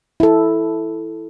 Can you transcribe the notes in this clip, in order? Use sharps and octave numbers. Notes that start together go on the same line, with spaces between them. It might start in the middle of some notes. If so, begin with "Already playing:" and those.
E4 A4